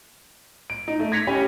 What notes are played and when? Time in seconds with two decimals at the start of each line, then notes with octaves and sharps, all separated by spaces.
0.70 D7
0.88 D#4
1.00 A3
1.12 G#6 A#6 B6 C#7 F7
1.27 C#4 G4 G#5 B5